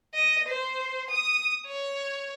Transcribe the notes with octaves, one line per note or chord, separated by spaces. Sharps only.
D#5
C5
D#6
C#5